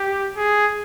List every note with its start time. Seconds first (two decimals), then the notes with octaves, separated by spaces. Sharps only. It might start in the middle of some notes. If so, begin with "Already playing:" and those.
Already playing: G4
0.37 G#4